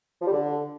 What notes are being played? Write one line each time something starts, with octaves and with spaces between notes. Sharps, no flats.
F3
G3
D3